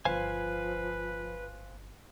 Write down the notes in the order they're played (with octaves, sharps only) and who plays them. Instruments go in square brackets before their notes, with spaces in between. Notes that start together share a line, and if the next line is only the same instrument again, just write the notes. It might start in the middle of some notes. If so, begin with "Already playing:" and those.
[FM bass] G1 [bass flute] F3 [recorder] B4 [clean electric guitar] C5 F5 G#5